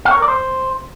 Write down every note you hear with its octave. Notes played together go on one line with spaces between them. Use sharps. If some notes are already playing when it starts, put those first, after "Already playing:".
F5
C#5
A#4
D5
C5